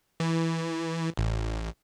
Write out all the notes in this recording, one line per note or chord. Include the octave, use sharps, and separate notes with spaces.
E3
A1